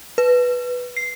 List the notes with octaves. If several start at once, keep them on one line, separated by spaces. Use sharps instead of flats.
B4
C7